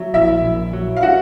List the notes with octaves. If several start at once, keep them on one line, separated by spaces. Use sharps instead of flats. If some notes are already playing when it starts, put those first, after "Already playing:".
Already playing: F#3 E5
A#1 E4 E5
A#1
F#3
F5
F#4 F#5